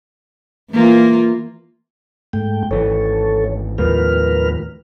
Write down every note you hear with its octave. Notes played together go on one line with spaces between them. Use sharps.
E3 A#3 F4
G#2 A3 G5
G#1 E3 A4 C#5
D#2 A2 F3 A#4 B4 F6